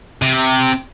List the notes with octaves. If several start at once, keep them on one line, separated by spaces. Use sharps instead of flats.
C3